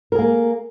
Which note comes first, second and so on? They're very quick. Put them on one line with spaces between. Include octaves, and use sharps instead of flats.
A#4 G#4 A#3